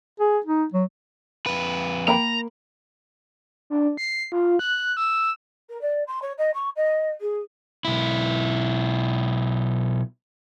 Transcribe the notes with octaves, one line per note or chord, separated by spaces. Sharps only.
G#4
D#4
F#3
F2 B4
A#3 G5 A#5 B5
D4
C7
F4
F#6
E6
A#4
D5
C6
C#5
D#5
C#6
D#5
G#4
B1 E4